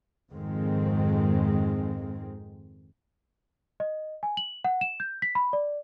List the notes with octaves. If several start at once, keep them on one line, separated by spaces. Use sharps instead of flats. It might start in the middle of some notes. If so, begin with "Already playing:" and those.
F2 G#2 D#3 G#3 C4
D#5
G#5
F#7
F#5
E7
G6
B6
B5
D5